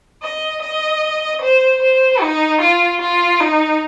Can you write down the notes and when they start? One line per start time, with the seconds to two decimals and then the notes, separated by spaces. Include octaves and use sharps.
0.23 D#5
0.62 D#5
1.42 C5
1.82 C5
2.22 D#4
2.61 F4
3.01 F4
3.40 D#4